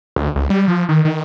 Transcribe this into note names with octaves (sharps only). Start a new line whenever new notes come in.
D2
C#2
G3
F3
D#3
D#3